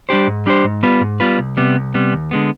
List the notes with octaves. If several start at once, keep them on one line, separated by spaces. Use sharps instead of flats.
G3 D4 G4 C5
G#2
G3 D4 G4 C5
G#2
G3 B3 F4 B4
G#2
G3 B3 F4 B4
C2
C3 G3 B3
C2
C3 G3 B3
D#2
D3 G#3 B3